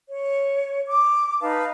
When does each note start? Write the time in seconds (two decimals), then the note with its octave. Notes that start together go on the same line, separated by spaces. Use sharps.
0.10 C#5
0.87 D6
1.40 D#4 B4 F5 A5